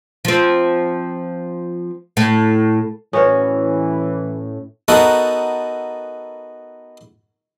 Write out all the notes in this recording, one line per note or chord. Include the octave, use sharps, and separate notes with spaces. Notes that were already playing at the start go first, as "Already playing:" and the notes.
F3 C4
A2
A2 E3 C#4 F#4 A4 B4 C#5
B3 D#4 F#4 A4 A#4 F#5